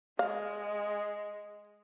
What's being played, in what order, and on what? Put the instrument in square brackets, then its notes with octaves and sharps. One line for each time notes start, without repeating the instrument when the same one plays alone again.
[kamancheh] G#3 [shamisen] F5